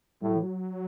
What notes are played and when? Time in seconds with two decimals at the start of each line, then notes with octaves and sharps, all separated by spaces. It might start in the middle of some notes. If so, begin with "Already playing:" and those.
0.22 A2 G3
0.30 F#3
0.36 E3
0.43 F#3